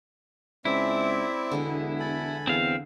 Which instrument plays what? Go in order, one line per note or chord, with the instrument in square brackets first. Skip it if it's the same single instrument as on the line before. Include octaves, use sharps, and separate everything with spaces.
[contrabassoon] C#2 [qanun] G#3 C#4 [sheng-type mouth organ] C4 D5 E5 [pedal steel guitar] E4
[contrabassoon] E1 [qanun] D3 G#3 B3
[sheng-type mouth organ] A4 G#5 B5
[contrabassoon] E2 [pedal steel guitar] C4 F5